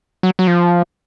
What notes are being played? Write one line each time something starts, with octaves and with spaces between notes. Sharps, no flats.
F#3
F#3
F3